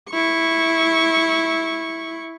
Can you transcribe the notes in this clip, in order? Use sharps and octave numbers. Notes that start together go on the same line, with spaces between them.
E4 C#6